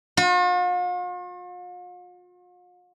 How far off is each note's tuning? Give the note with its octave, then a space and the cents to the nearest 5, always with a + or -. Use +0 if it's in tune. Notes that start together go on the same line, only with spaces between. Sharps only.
F4 +45